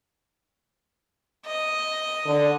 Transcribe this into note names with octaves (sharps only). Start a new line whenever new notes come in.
D#5
D3